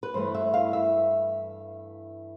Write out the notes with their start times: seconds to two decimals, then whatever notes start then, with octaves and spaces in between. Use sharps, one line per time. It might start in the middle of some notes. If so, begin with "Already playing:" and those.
0.03 B4
0.14 G2 E3 A3 C5
0.35 E5
0.54 F5
0.73 E5